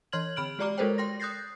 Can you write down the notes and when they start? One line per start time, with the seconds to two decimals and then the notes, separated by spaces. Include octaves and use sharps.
0.12 E3 C#5 C6 F6 G#6 F#7
0.36 D3 B5 F6 D7 F#7
0.59 G#3 G4 D5 A#5 D6 F6
0.78 G#3 A4 A#4 C5 C#5 G5
0.98 G5 C6 A#6
1.20 D#6 F#6 G6 A6 A#6 C7